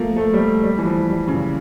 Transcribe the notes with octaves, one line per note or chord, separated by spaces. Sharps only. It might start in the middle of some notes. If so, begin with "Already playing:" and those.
Already playing: F3 A3 A#3
A3
G3
A3
G3
E3
F3
G3
C#3
A#2